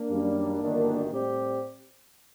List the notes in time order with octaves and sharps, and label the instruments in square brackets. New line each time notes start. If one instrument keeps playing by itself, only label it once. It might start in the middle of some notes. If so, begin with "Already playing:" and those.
Already playing: [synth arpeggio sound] A#3 D4
[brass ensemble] F#2 D#3 G3
G1 F#2 D#3
A2 G3 C4 G4